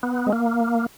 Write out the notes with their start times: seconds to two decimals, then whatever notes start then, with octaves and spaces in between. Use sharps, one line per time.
0.03 B3
0.27 G#3
0.33 A#3